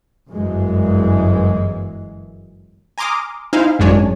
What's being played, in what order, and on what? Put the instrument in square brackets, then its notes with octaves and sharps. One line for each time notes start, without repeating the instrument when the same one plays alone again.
[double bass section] G1 F#2 E3 G#3
[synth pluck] G#5 A#5 C6 D6 D#6 F6
D#4 E4 C5 F5 G#5
G#1 F#2 G#3 D4 C#5 G#5